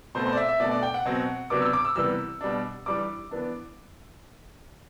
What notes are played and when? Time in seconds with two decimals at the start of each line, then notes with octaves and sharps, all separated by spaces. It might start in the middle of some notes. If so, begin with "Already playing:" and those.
0.15 B2 A3 C4 C5
0.26 C5
0.33 D5
0.37 E5
0.48 E5
0.60 B2 A3 D4 D5
0.71 D5
0.83 G5
0.94 F#5
1.05 B2 F#3 C4
1.50 C3 F#3 B3 D4 D6
1.62 E6
1.73 D6
1.85 E6
1.96 C3 E3 G3 B3 E6
2.41 B2 G3 D4
2.86 E3 G3 D4 D6
3.31 E3 B3 D4